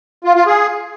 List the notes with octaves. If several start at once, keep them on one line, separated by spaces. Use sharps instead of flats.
F4
F4
G#4